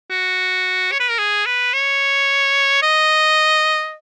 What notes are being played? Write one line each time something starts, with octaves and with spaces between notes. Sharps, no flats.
F#4
C#5
B4
A#4
G#4
B4
C#5
D#5